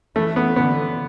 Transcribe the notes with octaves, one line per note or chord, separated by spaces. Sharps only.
E3 A3
B3
D3 B3